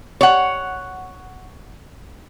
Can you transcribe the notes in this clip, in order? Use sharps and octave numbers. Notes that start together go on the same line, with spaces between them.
C#5 F#5